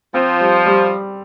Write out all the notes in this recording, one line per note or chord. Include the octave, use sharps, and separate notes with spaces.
F3 C4
G3
G3